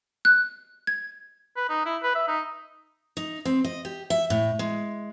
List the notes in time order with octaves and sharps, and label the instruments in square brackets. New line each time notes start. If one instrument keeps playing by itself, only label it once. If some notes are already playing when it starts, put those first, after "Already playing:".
[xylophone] F#6
G#6
[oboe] B4
D#4
E4
B4
E5
D#4
[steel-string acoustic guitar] D#4
C4
D#5
G4
E5
A2
G#3